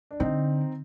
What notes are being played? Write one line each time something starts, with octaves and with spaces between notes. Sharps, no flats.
D4
D3 C4 D#4